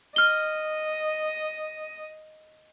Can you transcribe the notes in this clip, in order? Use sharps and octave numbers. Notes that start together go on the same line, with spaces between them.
D#5 F6 G7